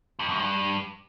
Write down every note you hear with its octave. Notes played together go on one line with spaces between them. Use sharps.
F2
F#2
G2